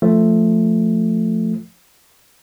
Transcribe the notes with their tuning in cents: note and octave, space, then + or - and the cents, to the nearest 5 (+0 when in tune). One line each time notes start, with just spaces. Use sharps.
F3 +0 A3 +5